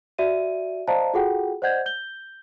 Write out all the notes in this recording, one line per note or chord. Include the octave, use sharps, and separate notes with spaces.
F#4 D5 E5 D#7
C5 D5 D#5 F5 A5 A#5
F4 F#4 G#4 A4 F#5 G5
C5 D5 D#5 F#5 G6 G#6
G6 G7